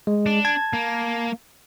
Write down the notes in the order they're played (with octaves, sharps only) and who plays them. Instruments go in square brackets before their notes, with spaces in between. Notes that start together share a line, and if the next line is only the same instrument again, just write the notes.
[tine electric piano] G#3
[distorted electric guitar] D4
[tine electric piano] A5 G#6
[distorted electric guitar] A#3